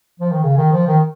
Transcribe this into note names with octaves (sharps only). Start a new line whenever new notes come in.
F3
D#3
C#3
D#3
F3
D#3